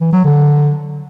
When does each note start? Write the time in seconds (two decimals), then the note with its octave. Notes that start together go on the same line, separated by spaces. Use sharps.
0.01 E3
0.13 F#3
0.25 D3